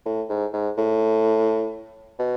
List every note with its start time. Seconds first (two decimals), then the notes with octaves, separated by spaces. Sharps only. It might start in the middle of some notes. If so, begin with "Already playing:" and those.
0.06 A2
0.29 G#2
0.54 G#2
0.78 A2
2.20 B2